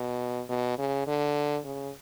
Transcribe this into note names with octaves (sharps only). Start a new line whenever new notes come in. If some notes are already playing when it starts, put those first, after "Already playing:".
Already playing: B2
B2
C#3
D3
C#3